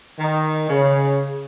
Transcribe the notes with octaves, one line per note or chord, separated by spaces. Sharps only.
D#3
C#3